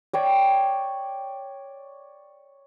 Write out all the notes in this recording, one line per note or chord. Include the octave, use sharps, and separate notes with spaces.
C#5 D5 G5